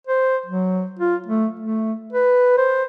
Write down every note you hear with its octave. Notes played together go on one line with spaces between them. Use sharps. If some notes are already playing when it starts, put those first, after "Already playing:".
C5
F#3
F4
A3
A3
B4
C5